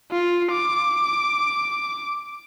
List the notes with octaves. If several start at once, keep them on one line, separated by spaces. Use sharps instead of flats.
F4
D6